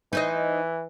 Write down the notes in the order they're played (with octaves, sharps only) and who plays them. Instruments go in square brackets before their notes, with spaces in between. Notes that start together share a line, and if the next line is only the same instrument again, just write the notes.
[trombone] E3 [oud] D#4 C5 D#5